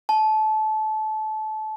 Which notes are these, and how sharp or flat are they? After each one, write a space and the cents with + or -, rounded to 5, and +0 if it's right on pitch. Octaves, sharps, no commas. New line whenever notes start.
A5 -25